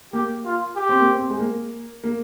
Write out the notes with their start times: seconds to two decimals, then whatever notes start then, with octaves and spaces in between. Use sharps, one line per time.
0.13 A#3 G4
0.45 F4
0.76 G4
0.89 C4
1.00 A#3
1.12 C4
1.30 G#3
1.40 A#3
2.04 A#3